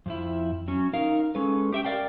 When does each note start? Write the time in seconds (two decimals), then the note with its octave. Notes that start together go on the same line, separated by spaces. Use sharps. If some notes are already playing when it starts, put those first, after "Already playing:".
0.06 F2 F3 E4
0.68 F#3 C#4
0.93 D#4 A#4 F5
1.35 G#3 C#4 A4 B4
1.73 G4 E5 G5
1.85 G4 A#4 D5 F5 G5